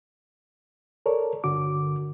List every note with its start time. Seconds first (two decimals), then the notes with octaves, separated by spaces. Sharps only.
1.06 A4 A#4 C#5 D5
1.44 G2 D3 F#4 D6